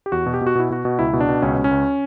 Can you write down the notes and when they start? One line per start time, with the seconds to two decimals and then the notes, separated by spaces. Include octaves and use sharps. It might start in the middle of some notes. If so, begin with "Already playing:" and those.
0.06 G4
0.12 E2 F#4
0.26 B2
0.34 G4
0.41 B2
0.47 F#4
0.55 B2 E4
0.70 B2 F#4
0.85 B2
0.99 C#2 E4
1.13 B2
1.21 D4
1.29 B2
1.42 C#2 C#4
1.58 C#2
1.64 C#4
1.71 C#2